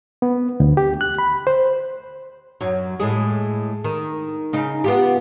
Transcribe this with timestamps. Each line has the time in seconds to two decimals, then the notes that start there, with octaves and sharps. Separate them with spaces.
0.22 B3
0.60 D2
0.77 G4
1.01 F#6
1.18 B5
1.47 C5
2.61 F#2 F#3
3.00 A2 G#3 G#4
3.84 D#3
4.53 C#3 D#4
4.84 B3 F4 G4